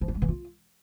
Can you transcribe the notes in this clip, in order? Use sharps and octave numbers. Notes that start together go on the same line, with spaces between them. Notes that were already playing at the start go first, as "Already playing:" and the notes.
F3
D4
G#3
E3
F4